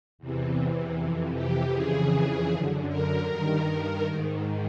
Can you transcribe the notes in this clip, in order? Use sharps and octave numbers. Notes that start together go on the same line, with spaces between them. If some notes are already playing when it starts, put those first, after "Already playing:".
E2 C3 E3
F2 C3 E3
G4
F2 C#3 E3 G#4
F#2 D3
A#4
G2 D#3
A#4
G#2 D#3